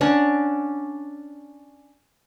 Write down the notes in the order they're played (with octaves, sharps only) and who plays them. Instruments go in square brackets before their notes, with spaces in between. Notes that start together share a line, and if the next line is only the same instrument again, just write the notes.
[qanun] C#4 D4 F#5 C#6